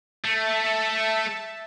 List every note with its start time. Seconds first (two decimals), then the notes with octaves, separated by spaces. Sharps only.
0.25 A3 E5 A5